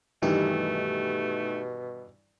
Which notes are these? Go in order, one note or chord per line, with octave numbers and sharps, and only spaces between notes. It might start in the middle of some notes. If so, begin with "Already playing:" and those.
G2 B2 D#3 E3 A3 D#4 G4